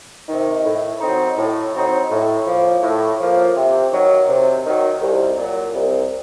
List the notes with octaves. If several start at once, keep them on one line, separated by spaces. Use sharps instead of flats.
C3 D#3
A2
F#3 C4 D#4
A2
F#3 C4 D#4
A2
F3 A#3
A2
F3 A#3
C3
D#3 F#3
C3
D#3 F#3
C2
A#2 F#3
C2